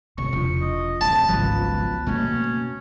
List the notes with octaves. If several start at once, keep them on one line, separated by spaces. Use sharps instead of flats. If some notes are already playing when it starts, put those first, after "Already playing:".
G1 C3 C#6
E1 F3
D#5
D1 C2 A5
G#1 C#2 F3 F#3 B3 B4
B2 A3 A#3 C#4